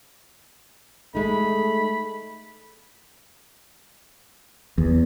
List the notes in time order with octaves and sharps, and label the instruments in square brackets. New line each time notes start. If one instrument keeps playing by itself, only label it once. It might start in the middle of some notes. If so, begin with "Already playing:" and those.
[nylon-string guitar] G#3 D#4 [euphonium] A3 [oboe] B5
[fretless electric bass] E2